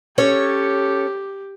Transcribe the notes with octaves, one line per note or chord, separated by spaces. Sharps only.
C#4 G4 A4 C#5